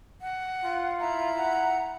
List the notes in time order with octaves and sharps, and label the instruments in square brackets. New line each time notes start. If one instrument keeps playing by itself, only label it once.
[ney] F#5
[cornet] F4
[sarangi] E4 [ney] A#5
[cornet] F#5